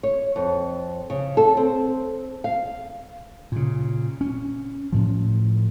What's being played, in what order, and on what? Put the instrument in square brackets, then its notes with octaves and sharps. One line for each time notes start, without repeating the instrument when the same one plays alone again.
[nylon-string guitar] C#5
F2
C#3
A4
C4
F5
[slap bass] A#2 C#3
C#4
A2 F3